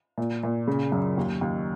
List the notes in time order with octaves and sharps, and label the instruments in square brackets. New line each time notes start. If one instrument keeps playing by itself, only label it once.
[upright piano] A#2
A#2
C#3
F#2
D#2
D#2